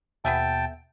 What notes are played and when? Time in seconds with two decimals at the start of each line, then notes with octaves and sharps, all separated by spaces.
0.25 D#2 B2 B3 G#4 E5 G5 A5